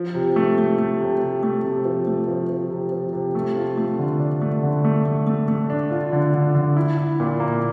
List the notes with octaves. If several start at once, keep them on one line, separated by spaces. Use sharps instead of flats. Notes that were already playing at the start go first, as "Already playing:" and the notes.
Already playing: F3
C3
A3
A3
A3
C3
C3
A3
C3
F3
A3
F3
F3
C3
F3
C3
A3
F4
A3
D3
D4
A3
D3
A3
A3
A3
A3
D4
F4
D3
D3
D3
E4
E4
A#2
A#3